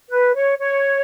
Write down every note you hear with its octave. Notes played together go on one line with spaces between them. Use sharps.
B4
C#5
C#5